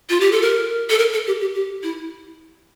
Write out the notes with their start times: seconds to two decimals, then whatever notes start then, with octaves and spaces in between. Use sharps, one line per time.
0.10 F4
0.20 G4
0.32 A4
0.42 A#4
0.90 A4
0.99 A#4
1.13 A4
1.27 G4
1.41 G4
1.55 G4
1.83 E4